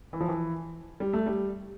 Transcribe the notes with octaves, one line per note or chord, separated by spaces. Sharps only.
E3
F3
E3
G3
A3
G3